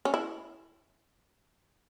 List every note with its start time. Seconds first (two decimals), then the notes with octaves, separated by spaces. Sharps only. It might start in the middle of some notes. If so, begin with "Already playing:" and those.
0.05 C#4
0.14 E4